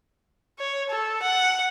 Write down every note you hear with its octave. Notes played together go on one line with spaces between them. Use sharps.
C#5
A4
F#5